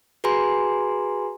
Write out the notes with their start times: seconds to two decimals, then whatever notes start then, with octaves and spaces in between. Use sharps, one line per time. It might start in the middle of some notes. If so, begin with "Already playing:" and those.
0.24 F#4 G#4 B4 G#5 A#5 C6